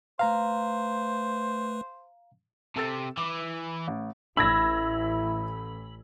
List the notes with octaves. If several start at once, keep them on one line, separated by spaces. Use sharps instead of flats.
A3 B4 C5 F5 A#5
C3 A4 E6 A6
E3 D6
A1
A1 E4 B5 E6 G#6 A#6